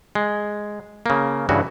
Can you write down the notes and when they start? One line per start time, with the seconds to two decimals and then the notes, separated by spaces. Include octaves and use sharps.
0.15 G#3
1.06 C#3 A#3
1.49 G2 C#3 E3 F#4